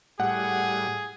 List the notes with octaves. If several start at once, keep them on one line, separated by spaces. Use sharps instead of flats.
A2 G3 G#4 F#5